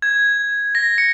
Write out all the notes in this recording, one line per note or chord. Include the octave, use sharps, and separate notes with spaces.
G#6
A#6
C#7